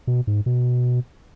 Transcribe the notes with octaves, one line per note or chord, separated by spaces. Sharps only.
B2
G#2
B2